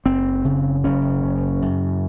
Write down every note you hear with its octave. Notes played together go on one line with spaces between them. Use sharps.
F#1 C4
C#3
F#1 C#4
C#3
F#2